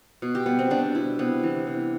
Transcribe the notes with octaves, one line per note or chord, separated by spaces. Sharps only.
B2
G4
G3 B3
C4
B2 D4
B3 E4
C3 B3
E3
C3